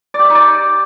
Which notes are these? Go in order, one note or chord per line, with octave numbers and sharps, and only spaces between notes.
D5
G4
E5
D#4
D5